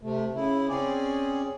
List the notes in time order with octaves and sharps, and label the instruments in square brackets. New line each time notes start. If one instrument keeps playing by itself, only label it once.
[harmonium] C3 A3
C#3 E4
C4 C#4 G#4 D5